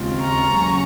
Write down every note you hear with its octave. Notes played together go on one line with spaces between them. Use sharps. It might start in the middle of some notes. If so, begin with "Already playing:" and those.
Already playing: D#2 C#3 G#3 C4 F4
A#5 C#6
D#2 C#3 F#3 C#4